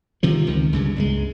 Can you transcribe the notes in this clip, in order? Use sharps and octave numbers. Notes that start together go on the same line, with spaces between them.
C3 D#3 F3
C#2 D#3
C#2 G2 C#3
C#2 G3 G#3